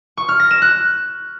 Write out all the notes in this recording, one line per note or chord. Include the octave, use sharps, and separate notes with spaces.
C#6
F6
A#6
E7
F#6